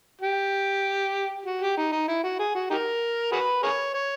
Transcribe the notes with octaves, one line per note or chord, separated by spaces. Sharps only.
G4
F#4
G4
D#4
D#4
E4
F#4
G#4
F#4
D#4 G4 A#4
F#4 G#4 B4
G#4 A#4 C#5
C#5